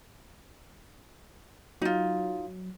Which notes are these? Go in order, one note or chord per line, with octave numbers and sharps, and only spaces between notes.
F#3 D#4 F4